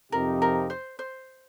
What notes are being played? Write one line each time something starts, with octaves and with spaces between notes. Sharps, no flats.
F2 C3 F3 D#4 G4 A#4
A#4
C5
C5